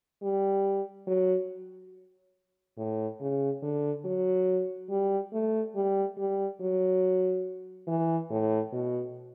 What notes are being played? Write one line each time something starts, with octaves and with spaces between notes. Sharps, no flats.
G3
F#3
A2
C#3
D3
F#3
G3
A3
G3
G3
F#3
E3
A2
B2